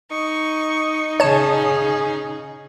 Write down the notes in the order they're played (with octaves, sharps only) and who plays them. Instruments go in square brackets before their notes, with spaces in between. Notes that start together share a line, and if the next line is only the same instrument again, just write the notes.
[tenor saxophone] D#4 [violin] C#6
[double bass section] C#3 [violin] C#4 G#4 [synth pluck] C#5 A5